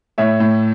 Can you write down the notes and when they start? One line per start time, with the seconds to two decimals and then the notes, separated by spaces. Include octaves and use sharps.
0.18 A2 C#5 E5
0.40 A2